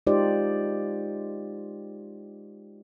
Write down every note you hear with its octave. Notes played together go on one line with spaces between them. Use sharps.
G#3 D#4 F4 G4 C5 D5